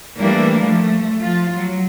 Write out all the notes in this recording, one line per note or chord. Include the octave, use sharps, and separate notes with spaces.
E3 G3 A3 A#3 D4
F3 A3
F3 F4
F#3